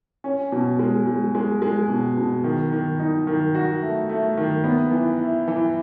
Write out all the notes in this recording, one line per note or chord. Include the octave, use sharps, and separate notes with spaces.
C#4
B2
G#3
G#3
G#3
G#3
B2
B2
D#3
D#3
D#4
D#3
F#4
A3
A3
D#3
B3
E3
E4
E3